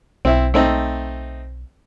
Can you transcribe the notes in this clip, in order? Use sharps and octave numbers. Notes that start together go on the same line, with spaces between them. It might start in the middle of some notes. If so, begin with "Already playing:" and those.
B1 C4 E4
A3 C4 D#4